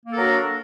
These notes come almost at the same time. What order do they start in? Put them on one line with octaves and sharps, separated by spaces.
A#3 A4 A#4 F#3 D4